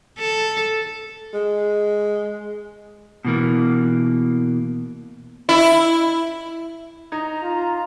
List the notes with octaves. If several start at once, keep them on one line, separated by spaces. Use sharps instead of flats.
A4
G#3
B2 E3 A#3
E4
D#4 A#5 G#6
F4